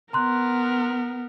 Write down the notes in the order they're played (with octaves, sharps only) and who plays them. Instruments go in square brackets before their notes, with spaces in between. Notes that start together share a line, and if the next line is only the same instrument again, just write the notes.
[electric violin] B3 A#4 [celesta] A#5 C6 F#6